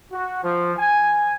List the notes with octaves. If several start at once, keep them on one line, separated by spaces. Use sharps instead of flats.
F#4
F3
G#5